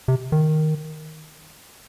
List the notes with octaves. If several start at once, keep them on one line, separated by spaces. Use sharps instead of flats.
C3
D#3